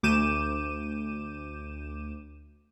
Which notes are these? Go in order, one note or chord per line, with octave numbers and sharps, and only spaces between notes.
D2 D6 G6 D#7 E7